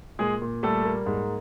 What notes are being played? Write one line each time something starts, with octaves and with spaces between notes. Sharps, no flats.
A#2 G#3 G#4
A#2
G3 A3 A4
A#3
G#2